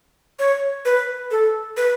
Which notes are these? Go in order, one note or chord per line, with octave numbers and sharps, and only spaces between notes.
C#5
B4
A4
B4